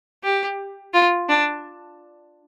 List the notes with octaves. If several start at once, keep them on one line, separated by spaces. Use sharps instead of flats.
G4
F4
D4